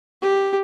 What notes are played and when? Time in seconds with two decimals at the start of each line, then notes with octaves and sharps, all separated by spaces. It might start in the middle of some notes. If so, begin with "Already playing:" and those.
0.22 G4